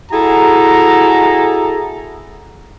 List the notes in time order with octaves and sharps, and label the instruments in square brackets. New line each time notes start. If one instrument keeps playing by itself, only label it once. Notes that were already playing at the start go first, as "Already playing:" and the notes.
[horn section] E4 F#4 G#4 A4 A#5